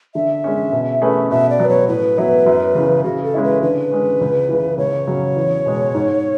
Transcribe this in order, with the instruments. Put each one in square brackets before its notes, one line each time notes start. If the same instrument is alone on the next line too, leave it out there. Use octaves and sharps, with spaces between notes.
[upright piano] D3 [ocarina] E5
[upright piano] G#3 C#4
B2
A3 C#4 G#4 B4
[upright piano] B2 [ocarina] E5
[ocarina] D5
[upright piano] F#3 B3
[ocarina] C#5
[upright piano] A2 [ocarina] B4
[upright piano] F#3 B3 E4
F#2
C#3 E3
[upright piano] C#3 [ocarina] F#4
[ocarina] A4
[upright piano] G#3 C#4 E4
[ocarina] B4
[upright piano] D3 [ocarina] B4
[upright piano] G#3 C#4
C#2
C#3 E3
[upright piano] C#2 [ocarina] C#5
[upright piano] C#3 F#3 C#4
E2
B2 G#3
G#2